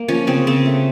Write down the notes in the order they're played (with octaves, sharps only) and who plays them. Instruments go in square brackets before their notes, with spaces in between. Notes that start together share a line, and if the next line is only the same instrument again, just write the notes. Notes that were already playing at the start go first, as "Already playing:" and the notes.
Already playing: [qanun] A#3
F3 C#4
C#3 C4
C#3 C4
A3